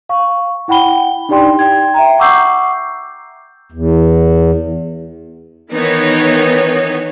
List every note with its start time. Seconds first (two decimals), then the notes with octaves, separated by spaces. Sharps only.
0.09 F5 C#6
0.68 E4 F#5 G5 B5 G7
1.29 D4 D#4 G4 D5 G5 C6
1.59 G5 G#6
1.94 E5 G5 A#5
2.19 F#5 C#6 D6 E6 G6 C7
3.72 E2
5.73 D#3 E3 B3 D#4 C#5